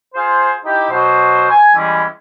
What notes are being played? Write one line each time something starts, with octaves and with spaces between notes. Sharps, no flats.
F4 G#4 C5
D#4 E4 G4
B2 F#3 C5
G#5
E3 G3 G#3 C#4 E4